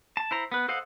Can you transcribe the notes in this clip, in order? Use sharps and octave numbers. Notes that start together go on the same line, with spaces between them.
A5
E4 C5 A#5
B3 B4
A4 C5 D#5 F5 F#5